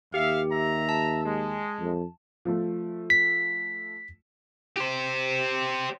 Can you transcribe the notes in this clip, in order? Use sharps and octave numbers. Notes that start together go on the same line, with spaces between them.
D#2 G4 E5 F5
E5 A#5
A5
G#3
F2
F3 A3
B6
G4 C5